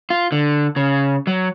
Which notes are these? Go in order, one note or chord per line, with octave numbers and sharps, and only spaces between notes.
F4
D3
C#3
F#3